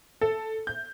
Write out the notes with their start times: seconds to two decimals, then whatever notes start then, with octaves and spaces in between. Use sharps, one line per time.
0.21 A4
0.67 G6